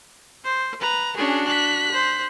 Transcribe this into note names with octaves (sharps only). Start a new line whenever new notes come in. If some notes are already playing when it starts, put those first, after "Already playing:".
C5
B4 A#5
C#4 D4 F#4 G#4
F#6 B6
C5